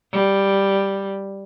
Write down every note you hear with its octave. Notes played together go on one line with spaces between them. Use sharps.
G3